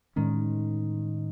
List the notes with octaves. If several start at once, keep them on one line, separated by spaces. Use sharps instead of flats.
A2 D#3 G#3 C#4